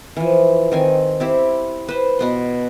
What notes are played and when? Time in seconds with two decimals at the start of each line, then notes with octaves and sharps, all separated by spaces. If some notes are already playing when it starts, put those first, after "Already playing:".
0.16 E3 F3
0.72 D#3 C4 G#5
1.20 C4 E4 G4
1.88 B4 C5
2.19 B2 B3 C6